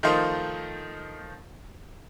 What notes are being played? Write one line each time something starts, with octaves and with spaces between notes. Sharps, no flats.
D#3 F3 A3 D#4 F4 C5